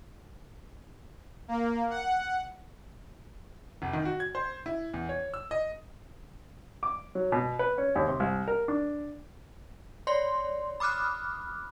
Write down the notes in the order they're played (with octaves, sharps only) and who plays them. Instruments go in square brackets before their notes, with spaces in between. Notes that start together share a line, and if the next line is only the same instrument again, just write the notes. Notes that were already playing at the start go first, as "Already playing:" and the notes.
[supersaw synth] A#3
F#5
[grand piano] F1
D#3
F#4
G#6
C5
E4
E2
C#5
E6
D#5
[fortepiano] D6
F#3
B2
B4
C#4
D#2
C3
C2
A#4
D4
[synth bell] C#5 D5 C6
B5 D6 D#6 F6 F#6